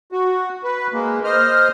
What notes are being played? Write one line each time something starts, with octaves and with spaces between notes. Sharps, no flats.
F#4
B4
G#3 A#3
C5 D#5 F6